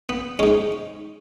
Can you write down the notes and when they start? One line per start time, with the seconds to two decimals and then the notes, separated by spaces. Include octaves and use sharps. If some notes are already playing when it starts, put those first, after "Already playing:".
0.09 B3
0.39 G#2 G#3 C#4